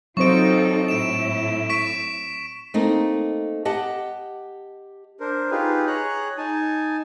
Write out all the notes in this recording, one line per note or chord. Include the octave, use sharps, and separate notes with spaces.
F#3 C4 D#4 F4 A4 C5 C#6 D7
A2 E4 D7 E7
C#6 B6 D7
A3 A#3 C4 D#4
G4 D#5 F#5 A5
D4 A#4 C5
D#4 F4 G4 G#4 B4
G#4 C#5 A#5 F#6
D#4 G#5 A5